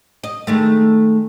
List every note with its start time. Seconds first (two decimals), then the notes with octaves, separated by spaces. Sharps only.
0.24 D#5
0.47 D#3 G#3 A3